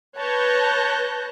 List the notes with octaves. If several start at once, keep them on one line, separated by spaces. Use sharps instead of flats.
B4 C#5 A5 F#6 G6 A#6